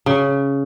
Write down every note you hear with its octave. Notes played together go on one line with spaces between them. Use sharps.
C#3